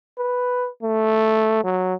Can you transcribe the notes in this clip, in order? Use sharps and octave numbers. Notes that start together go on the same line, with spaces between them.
B4
A3
F#3